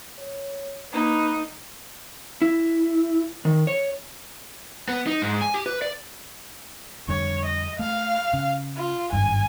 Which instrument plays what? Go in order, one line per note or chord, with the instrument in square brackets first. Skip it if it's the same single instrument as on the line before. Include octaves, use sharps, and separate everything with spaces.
[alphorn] C#5
[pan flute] A#3 [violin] D#4 [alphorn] B4
[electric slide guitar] E4
D#3
C#5
[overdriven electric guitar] B3
D#4
G#2
G#5
G4
B4
D5
[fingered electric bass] F2 D3 G3 [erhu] C#5
[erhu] D#5
[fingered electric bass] A3 [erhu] F5
[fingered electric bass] C#3
[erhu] F4
[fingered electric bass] G#1 G2 [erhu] G#5